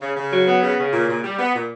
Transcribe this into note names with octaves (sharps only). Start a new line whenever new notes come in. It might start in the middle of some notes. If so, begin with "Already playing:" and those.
C#3
C#3
F#3
B3
C#3
C#3
A#2
A#2
G3
B3
A#2